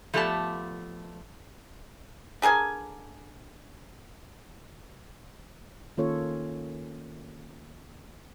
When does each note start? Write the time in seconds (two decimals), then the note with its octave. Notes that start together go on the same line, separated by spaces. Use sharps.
0.14 F3 A3 B3 G4 D5 A5
2.42 D3 G#4 A#4 G#5
5.97 D#3 A#3 C#4 F4 A4 C#5